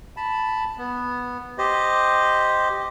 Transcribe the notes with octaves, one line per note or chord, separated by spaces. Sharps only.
A5 B5
B3
G4 C5 D#5